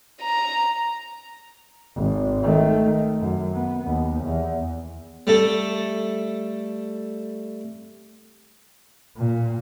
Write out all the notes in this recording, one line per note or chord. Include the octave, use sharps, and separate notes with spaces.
A#5
G#1
D#3 A3
F#2
B3
D#2
E2
G3 A3 A4
A#2